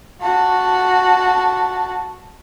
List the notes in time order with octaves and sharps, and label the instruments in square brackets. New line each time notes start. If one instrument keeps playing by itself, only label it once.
[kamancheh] F#4 A5